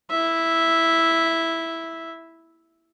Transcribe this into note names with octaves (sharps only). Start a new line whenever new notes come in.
E4 E5